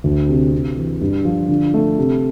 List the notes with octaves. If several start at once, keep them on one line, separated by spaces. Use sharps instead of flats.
D2
C3
C3
E3
G2
F3
D3
A3
C3